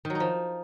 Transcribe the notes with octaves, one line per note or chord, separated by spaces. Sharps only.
D#3
F#3
D#4
F3